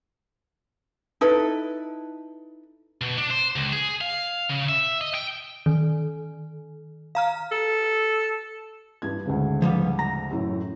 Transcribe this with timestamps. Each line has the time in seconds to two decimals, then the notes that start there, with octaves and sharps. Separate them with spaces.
1.21 D#4 E4 A4 B4
3.01 B2
3.18 D4
3.31 C5
3.56 C#2
3.72 G#4
4.01 F5
4.49 C#3
4.69 E5
5.01 D#5
5.14 G5
5.66 D#3
7.15 F5 A#5 F6
7.51 A4
9.02 G2 E3 G#6
9.25 D2 G#2 C#3
9.62 F3 G3 B3
9.99 A#5
10.31 F#2 A2 E3